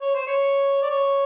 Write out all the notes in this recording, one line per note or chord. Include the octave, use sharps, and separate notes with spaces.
C#5
C5
C#5
D5
C#5